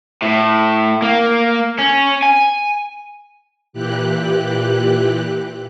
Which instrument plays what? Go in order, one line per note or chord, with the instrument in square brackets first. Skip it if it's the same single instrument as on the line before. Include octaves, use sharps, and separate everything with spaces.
[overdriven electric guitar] A2
A#3
C#4
G#5
[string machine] A#2 E3 G4 F#6